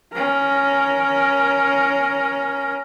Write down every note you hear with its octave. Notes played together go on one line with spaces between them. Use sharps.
C#4 A#4